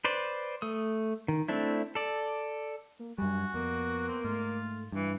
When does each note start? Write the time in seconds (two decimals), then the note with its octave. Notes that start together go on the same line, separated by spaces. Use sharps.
0.04 B4 C5 D5
0.62 A3 D#6
1.28 D#3
1.48 A3 C4 D4 E4
1.95 A4 D5
2.99 A#3
3.18 F#2 G3 F#4 G#5
3.54 F2 A#3 B3
4.08 C4
4.24 G#2 A3 F4
4.92 G2 E3